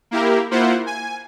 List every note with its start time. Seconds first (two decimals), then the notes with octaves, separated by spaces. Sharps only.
0.11 A#3 E4 G4 A#4
0.51 A#3 E4 F4 C5 F#5
0.86 G#5